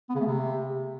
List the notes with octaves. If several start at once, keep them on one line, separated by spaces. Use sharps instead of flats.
B3
C#3
A3
C3